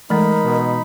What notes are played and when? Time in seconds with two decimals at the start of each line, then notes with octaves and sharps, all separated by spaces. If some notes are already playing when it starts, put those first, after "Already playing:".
0.10 E3 G#3 A3 D#4 A#4 B5
0.44 B2